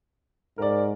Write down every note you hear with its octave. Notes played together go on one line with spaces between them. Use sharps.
G#2 A#4 D5